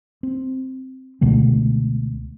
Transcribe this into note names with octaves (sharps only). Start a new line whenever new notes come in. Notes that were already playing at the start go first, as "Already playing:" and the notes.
C4
C#2 B2 D3 A3